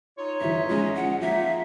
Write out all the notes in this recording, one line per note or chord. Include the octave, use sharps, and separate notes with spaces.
D#4 F4 C#5
G1 E3 E5
F3 G#3 C#4
F#5
F3 A#3 C#4 D#4 E5